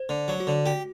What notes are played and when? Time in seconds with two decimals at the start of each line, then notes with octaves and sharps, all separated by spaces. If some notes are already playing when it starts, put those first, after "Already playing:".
Already playing: C5
0.09 D3
0.28 F#3
0.40 F#4
0.47 D3
0.66 F#4 G4